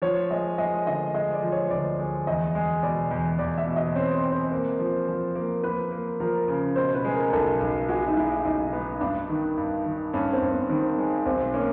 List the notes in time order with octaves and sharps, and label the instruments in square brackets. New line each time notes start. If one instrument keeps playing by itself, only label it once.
[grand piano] F3 [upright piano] C#5
[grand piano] G#3 [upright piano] D#5
[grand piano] G#3 [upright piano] D#5
[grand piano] D3 [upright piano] D#5
[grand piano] G#3 [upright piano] D#5
[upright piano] D5
[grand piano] F3
[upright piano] C#5
[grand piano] D2 [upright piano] D5
[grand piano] G#3
[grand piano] E2 [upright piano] D#5
[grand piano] G#3
[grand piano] B2 [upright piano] D5
[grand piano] E2
[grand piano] E2 [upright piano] D5
[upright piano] E5
[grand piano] B2
[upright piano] D#5
[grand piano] C4 [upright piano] C#5
[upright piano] C5
[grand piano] C4
[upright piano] C5
[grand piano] A#3
F3
F3
A#3
[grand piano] A#3 [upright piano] B4
[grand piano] A#3
[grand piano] F3 [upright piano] A#4
[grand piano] C#3
[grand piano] B2 [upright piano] C5
[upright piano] B4
[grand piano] G#3
[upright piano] A#4
[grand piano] B1 [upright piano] A4
[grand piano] B1
[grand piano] G#3 [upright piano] F#4
[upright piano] D#4
[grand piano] G#3 [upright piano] E4
[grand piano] B1 [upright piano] D#4
[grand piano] B3
[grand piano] G2 [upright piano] D4
[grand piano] D#3
G2
D#3
[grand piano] G2 [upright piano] C#4
[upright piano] C4
[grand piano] G2
[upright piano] B3
[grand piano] D#3 [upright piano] C4
[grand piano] G#3
[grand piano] B1 [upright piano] C4
[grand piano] A#3 [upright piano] C#4